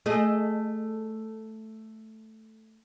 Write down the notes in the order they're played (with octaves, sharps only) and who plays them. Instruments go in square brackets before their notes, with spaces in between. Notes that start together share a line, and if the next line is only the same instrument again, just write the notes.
[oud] A3 G#4 D#5